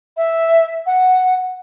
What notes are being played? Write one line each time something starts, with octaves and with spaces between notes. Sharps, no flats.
E5
F#5